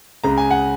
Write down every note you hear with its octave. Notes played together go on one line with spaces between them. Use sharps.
C#2 C#3 G#3 A#5
G#5
F#5